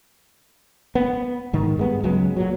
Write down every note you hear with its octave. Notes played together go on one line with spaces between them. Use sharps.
B3
G#2 D#3
G2 G#3 B3
C#2 F#3 G#3 B3
A#2 F#3